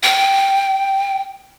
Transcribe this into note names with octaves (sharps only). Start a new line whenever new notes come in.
G5